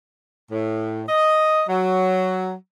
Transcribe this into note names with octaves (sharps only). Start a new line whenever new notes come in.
A2
D#5
F#3